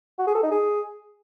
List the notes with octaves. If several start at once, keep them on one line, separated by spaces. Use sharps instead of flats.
F#4
G#4
A4
D#4
G#4